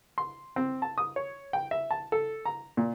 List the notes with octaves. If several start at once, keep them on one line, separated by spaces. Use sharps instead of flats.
C6
C4
A5
D#6
C#5
G5
E5
A5
A4
A#5
A#2